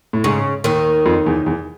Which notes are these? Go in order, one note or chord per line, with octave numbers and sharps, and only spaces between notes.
A2
G#2 C#3
D#2 D#3
F2
E2
E2